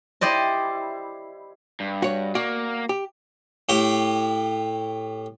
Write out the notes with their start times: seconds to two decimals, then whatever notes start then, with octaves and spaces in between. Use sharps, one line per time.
0.21 E4 G4 C5 D5 D#5
1.80 G2
2.02 F#4 C#5
2.35 A#3 F#4 D5
2.89 G4
3.69 A2 G4